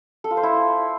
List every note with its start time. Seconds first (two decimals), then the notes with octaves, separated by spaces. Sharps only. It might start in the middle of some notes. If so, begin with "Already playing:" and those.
0.24 A4
0.31 F4
0.37 C5
0.43 E4